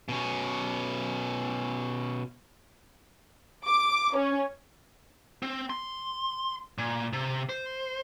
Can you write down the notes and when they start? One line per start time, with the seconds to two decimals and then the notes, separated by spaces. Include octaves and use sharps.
0.09 B2 C#4
3.66 D6
4.16 C#4
5.43 C4
5.70 C6
6.78 A#2
7.13 C3
7.49 C5